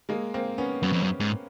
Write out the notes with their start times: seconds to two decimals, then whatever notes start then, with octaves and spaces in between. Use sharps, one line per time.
0.09 G#3 A#3
0.34 A#3 C4
0.58 B3 C#4
0.82 F#2 B3 C#4
0.93 F2
1.03 F#2
1.20 G#2